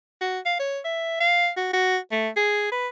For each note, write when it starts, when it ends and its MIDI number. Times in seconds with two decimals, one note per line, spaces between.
0.21 0.40 66
0.46 0.56 77
0.60 0.80 73
0.85 1.20 76
1.21 1.50 77
1.57 1.71 66
1.74 1.98 66
2.12 2.29 57
2.37 2.69 68
2.72 2.88 71